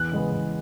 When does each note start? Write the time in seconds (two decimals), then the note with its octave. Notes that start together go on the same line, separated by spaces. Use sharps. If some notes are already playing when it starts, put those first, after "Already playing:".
Already playing: E2 F#6
0.12 C#3 G#3 B3
0.32 E2